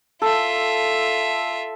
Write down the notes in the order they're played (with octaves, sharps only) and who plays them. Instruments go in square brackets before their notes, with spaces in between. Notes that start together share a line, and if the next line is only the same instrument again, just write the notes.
[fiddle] F4 E5 [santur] A4